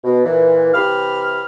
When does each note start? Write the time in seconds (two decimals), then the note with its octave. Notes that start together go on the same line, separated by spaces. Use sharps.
0.04 B2
0.24 A#2 E3
0.74 C3 E3 G4 B5 F6